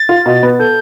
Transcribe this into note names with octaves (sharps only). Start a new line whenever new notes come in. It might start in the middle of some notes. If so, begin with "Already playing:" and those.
Already playing: A6
F4
B2
B3
A4 G6